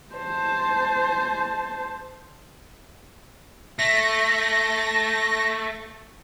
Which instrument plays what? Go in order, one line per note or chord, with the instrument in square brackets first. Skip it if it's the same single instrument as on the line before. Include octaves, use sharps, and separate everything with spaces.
[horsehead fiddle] C5 A5
[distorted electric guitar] A3 [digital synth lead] A#6